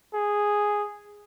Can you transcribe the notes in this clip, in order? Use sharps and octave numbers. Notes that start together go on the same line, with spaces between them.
G#4